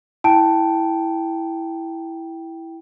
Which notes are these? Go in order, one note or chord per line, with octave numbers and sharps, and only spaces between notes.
E4 G5 A5 D7